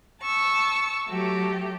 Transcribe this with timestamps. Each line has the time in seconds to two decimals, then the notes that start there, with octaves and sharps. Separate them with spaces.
0.23 A5 C#6 E6
1.08 F#3 A3 G4